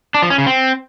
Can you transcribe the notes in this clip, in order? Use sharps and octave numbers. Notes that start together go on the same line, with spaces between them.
D4
F3
C#4
C#3
C4